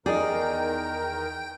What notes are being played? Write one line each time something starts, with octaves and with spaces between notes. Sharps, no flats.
E2 D#3 D#4 G#4 A#4 D5 G5